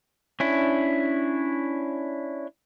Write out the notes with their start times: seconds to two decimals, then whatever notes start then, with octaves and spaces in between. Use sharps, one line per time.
0.40 C#4 D4 E4